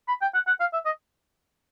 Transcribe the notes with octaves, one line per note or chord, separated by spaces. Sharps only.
B5
G5
F#5
F#5
F5
E5
D#5